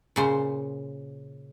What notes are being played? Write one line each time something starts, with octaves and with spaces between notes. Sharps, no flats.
A#2 C#3 C5